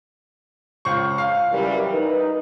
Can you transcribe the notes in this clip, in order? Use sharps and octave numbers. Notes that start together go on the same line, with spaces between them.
C#2 C5 C#6
F5
F#2 E3 G3 A#4
D#4 B4